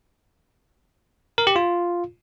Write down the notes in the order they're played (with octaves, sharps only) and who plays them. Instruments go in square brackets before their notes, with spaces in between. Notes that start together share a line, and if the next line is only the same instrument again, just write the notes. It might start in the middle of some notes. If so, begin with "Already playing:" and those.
[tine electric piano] A#4
G4
F4